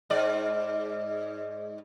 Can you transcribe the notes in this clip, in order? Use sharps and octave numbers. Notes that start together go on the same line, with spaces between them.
G#2 D5